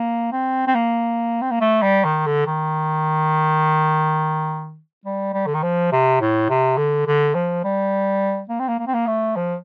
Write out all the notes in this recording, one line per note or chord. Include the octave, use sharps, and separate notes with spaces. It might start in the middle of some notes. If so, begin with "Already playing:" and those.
Already playing: A#3
C4
C4
A#3
C4
A#3
A3
G3
D#3
D3
D#3
G3
G3
D3
D#3
F3
C3
A2
C3
D3
D3
F3
G3
A#3
C4
A#3
A#3
C4
A#3
A3
F3